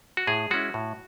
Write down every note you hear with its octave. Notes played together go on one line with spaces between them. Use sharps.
F#4
A2 G#4
G#3 C#4 E4 F#4
A2